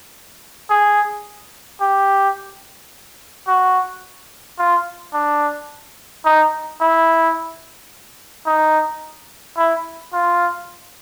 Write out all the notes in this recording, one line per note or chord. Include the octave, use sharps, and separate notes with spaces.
G#4
G4
F#4
F4
D4
D#4
E4
D#4
E4
F4